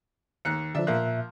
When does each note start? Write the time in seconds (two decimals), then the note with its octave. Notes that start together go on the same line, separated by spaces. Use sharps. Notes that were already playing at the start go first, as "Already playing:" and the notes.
0.45 D#2 F#6 C#7
0.75 D3 F3 D4 E5
0.87 A#2 F3 A#3 E5 F#6